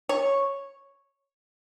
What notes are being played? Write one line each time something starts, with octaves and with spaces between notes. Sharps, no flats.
C#5